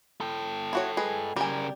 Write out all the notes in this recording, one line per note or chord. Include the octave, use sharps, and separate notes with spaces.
A4 G5
E4 F#4 C#5
G#3 G#4 B4
C#3 G3 A#4 G#5